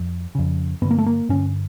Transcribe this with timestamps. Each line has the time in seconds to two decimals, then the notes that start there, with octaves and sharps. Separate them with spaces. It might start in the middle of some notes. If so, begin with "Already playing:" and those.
Already playing: F2
0.35 F2 C#3
0.82 G2 B3
0.85 D3
0.91 A#3
0.98 A3
1.06 A#3
1.29 G2 D3 C#4